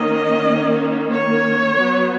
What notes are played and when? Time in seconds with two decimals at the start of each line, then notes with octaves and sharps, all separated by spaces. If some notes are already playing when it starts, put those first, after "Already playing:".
Already playing: D#3 A#3 C#4 D#5
1.12 C#5
1.80 F#3 B3